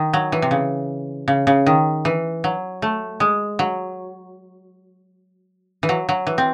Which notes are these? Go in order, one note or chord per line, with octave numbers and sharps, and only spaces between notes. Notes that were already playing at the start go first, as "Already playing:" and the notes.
Already playing: D#3
F#3
E3
C3
C#3
C#3
C#3
D#3
E3
F#3
A3
G#3
F#3
E3
F#3
F#3
E3
C4